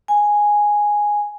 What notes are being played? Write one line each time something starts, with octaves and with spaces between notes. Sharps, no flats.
G#5